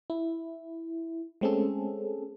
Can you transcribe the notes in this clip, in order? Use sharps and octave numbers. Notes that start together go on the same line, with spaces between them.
E4
G#3 A3 C4 C#4 G#4 A4